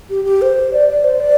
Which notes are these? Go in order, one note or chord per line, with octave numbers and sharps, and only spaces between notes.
G4
G4
C5
D5
D5
C5
D5